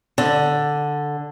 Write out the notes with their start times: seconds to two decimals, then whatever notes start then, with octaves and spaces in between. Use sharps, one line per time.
0.18 D3